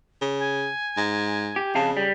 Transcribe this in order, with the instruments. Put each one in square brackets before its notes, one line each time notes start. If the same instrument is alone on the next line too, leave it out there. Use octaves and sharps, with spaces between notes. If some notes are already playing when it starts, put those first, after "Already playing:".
[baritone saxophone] C#3
[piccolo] G#5
[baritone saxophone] G#2
[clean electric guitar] G4
[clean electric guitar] F2 F5 A5 [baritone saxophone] C#3
[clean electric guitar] G3